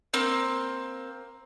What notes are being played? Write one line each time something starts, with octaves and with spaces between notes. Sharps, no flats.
A#3 C4